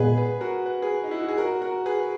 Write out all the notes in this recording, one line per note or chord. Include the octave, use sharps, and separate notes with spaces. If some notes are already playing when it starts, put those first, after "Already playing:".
Already playing: A#2 G#3 B3 G#4 B4
G#4 B4
F#4 A#4
B4
G#4 B4
D#4
E4
F#4
G#4
F#4 A#4
F#4 A#4
G#4 B4